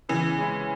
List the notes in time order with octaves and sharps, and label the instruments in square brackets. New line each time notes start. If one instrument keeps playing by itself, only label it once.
[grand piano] C#3 [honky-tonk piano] E3
[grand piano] G#3 C#4 E4